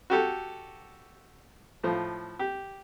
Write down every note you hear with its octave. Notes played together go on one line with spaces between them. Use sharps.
F#4 G4 A4
A2 F3
G4